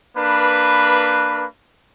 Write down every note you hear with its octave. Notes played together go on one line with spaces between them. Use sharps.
A#3 D4 B4